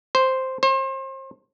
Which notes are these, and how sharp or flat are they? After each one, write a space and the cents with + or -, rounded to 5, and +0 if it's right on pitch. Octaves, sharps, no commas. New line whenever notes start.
C5 +0
C5 +35